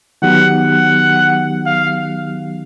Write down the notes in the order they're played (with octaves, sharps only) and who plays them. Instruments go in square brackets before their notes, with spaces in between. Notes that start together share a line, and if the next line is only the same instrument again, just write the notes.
[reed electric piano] D#3 F#3 B3 D#4 G4 [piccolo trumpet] F#5
[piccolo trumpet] F#5
F5